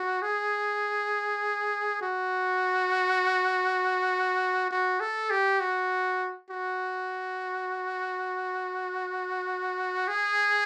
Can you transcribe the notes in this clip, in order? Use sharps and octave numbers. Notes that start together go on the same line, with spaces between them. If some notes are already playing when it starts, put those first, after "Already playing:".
Already playing: F#4
G#4
F#4
F#4
A4
G4
F#4
F#4
G#4